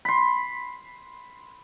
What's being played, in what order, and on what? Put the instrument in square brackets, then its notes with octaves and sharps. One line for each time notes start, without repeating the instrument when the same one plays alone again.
[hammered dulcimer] B5 C6